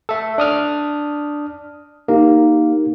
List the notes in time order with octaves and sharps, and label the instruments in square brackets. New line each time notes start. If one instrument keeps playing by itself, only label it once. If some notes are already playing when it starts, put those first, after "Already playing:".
[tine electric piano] A4 E5
D4 D#6 F6
[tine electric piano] A#3 [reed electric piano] D#4 G4 A#4